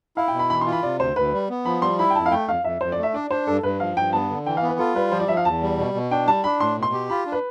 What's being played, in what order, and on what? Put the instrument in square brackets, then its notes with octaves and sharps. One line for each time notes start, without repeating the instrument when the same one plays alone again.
[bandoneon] E4 [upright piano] F5
[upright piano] G5
[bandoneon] B2
[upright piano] B5
[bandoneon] E3 [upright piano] B5
[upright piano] C6
[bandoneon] F4
[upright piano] B5
[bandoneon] C3 [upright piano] D5
[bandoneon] D2 [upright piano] C5
[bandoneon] D2 [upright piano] B4
[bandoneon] G3
B3
[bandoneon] F3 [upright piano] B5
[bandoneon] G3 [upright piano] C6
[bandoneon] E4 [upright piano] B5
[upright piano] G5
[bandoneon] F2 [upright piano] A5
[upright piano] F5
[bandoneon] A3 [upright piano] G5
[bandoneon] F2 [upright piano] F5
[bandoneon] F2 [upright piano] E5
[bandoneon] F2 [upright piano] C5
[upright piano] D5
[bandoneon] A3
[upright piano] E5
[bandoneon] D4 [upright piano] D5
[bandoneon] D4 [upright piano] C5
[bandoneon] G2 [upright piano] A4
[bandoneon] G2 [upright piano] B4
[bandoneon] F3 [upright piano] F5
[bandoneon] G2 [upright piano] G5
[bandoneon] B3 [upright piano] A5
[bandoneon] D3
[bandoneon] E3 [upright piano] G5
[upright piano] F5
[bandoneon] B3
[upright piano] B4
[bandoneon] F4 [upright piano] A4
[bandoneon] G3 [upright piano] B4
[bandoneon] F3 [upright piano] C5
[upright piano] D5
[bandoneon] F3 [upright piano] E5
[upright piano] F5
[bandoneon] E2 [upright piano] A5
[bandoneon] G3
B2
B2
[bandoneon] D4 [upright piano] G5
[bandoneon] G3 [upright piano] A5
[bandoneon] D4 [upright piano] B5
[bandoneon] A2 [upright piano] C6
[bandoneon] B2 [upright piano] C6
[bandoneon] G4
[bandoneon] F4 [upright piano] B5
[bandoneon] D4
[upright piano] B4